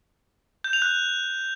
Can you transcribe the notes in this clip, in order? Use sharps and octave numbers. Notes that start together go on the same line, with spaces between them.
G6
F7
F#6